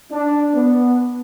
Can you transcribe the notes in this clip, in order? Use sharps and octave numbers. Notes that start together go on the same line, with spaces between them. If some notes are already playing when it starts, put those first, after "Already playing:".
D4
B3